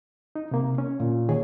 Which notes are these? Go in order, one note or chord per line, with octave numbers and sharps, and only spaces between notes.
D#4
C3 A#3
C#4
A#2
D#3 G#4 C#5